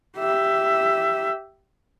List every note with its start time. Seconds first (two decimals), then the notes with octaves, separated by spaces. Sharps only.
0.18 G4 E5